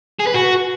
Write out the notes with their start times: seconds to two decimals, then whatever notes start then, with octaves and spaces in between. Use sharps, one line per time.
0.19 G#4
0.27 B4
0.34 F#4